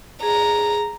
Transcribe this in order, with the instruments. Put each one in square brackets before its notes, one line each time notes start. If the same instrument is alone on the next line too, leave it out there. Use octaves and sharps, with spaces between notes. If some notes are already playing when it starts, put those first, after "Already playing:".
[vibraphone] G#4 [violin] A#5